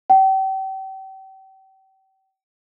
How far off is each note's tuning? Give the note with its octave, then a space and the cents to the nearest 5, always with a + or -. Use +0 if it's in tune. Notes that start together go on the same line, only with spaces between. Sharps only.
G5 -35